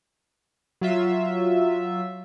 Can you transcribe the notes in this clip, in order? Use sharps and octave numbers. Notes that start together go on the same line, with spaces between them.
F#3 F4 E5